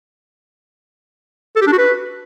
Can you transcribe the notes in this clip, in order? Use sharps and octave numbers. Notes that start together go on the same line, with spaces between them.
A4
G4
D4
F#4
B4